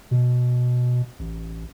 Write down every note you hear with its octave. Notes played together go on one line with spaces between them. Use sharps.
B2
A1